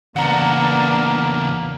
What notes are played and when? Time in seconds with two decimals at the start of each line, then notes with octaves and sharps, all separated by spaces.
0.16 E2 C#3 A#3 B3 D4 F#5 A#5